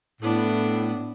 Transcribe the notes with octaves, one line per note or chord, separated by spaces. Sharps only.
A2 B3 D4